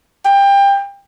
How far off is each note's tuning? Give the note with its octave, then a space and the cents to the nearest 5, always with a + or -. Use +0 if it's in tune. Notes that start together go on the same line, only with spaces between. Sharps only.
G5 +25